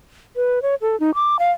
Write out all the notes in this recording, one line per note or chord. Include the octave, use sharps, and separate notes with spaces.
B4
C#5
A4
D#4
D6
F5